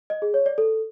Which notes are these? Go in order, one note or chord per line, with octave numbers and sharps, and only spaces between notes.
D#5
G#4
C#5
D5
A4